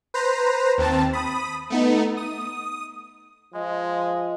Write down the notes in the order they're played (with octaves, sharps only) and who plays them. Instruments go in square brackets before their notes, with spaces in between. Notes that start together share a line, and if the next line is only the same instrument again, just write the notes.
[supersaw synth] B4 C5 A#5
D#2 C4 A5
B5 D#6
A3 B3 D#4
D#6
[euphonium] F3 [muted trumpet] G#3 [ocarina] D#5